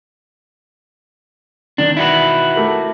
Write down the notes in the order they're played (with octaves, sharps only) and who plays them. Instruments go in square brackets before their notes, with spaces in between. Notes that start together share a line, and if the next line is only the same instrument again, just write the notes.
[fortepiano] D#3 [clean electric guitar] D4
[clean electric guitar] E4 F#4 B4
[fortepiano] A3 G4 A#4